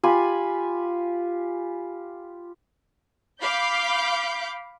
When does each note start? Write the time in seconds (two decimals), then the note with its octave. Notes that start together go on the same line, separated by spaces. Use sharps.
0.03 F4 G4 G#5 B5
3.41 F5 B5 D6 G6